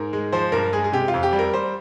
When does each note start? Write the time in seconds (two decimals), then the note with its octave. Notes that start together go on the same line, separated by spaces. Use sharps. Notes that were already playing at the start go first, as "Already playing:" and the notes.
Already playing: G#2 A#4
0.13 G#3
0.32 F3 C5
0.52 G2 A#4
0.73 G#3 G#4
0.84 G#4
0.92 C3 G4
1.08 F4
1.14 F2
1.23 G4
1.33 G3
1.39 A#4
1.53 G3 C5